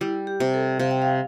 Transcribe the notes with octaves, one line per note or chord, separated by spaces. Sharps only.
G3 E4
G4
C3
A4
C3 F5
G5
F5